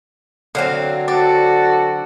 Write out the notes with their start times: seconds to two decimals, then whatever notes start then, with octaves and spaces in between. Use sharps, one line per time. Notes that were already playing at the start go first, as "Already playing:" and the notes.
0.55 D3 F#3 C4 F5
1.08 F#4 A4 D5